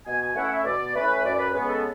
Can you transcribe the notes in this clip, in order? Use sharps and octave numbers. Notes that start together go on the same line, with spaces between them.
B2 G#5
G#5
A3 C#4 E4 F#5
E5
B2 D5
A3 C#4 E4 B4
F#2 D5
B4
C#3 G#3 B3 B4
A4